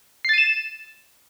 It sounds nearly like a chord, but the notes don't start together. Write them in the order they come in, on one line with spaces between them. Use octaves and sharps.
C7 A6 D#7 E7